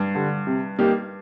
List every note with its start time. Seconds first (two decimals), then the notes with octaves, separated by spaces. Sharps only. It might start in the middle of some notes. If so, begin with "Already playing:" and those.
Already playing: G2
0.15 D3 G3
0.47 C3
0.79 G3 A#3 D#4 G4